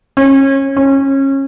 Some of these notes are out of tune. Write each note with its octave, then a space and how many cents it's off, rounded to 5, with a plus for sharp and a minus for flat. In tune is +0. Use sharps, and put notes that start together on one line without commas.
C#4 -30
C#4 -25